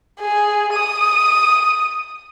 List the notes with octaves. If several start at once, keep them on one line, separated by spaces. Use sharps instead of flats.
G#4
D#6